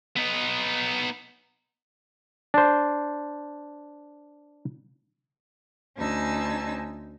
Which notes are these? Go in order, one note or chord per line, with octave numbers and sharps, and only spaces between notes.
B3 D#4
D4 C5
D2 C#4 D#4 G#5 A5 E6